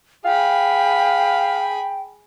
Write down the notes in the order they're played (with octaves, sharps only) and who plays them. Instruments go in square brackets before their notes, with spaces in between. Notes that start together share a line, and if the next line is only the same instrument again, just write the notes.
[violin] G#4 B5 [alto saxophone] F5 [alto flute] G5